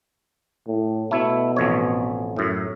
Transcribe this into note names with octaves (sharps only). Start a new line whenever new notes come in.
A2
B2 A3 E4
A1 F2 C#5
F#2 A2